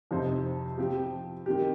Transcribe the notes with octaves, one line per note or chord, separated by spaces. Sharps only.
F2 C3 F3 D#4 C5
F3 C4 G4
D#3 C4 G4